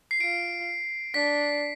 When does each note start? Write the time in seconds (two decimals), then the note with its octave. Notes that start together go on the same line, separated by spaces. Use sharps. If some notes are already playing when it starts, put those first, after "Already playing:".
0.11 C7
0.20 F4 D7
1.14 D4 B6